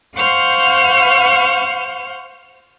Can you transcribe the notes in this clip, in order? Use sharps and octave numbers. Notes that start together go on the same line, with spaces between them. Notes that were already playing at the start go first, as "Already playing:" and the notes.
C5 F5 F#5 C#6 F6 G6